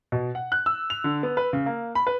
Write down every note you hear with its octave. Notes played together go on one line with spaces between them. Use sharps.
B2
F#5
F#6
E6
F7
D3
B3
B4
C#3
A#3
B5
B4